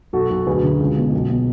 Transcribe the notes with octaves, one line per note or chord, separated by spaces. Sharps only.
B1 F#4 A4
B1
D2 G#4 B4
D3
C#2
B2
B1
B2